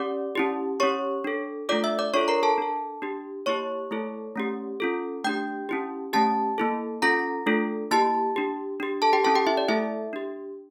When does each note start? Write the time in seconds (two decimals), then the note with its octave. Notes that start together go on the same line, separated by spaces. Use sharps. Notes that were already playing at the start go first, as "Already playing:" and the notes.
Already playing: C#4 G4 D5 D6
0.35 C#4 E4 G4
0.80 C#4 G4 C#5 C#6
1.24 D4 A4
1.69 A3 D4 F4 A4 D5 D6
1.84 E5 E6
1.99 D5 D6
2.14 D4 F4 A4 C#5 C#6
2.28 A#4 A#5
2.43 A4 A5
2.58 D4 A4
3.02 D4 G4
3.46 A#3 E4 G4 C#5 C#6
3.91 A3 E4 A4
4.36 A3 C#4 G4
4.80 C#4 F4 A4
5.24 A3 D4 G4 G5 G6
5.69 C#4 E4 G4
6.13 A3 C#4 G4 A5 A6
6.58 A#3 E4 A4
7.02 C#4 F4 A4 A#5 A#6
7.46 A3 D4 F4 A4
7.91 A#3 E4 G4 A5 A6
8.36 D4 G4
8.80 D4 G4
9.02 A4 A5
9.13 G4 G5
9.24 C#4 E4 A4 A5
9.35 G4 G5
9.47 E4 E5
9.57 D5
9.69 A3 E4 A4 E5
10.13 D4 G4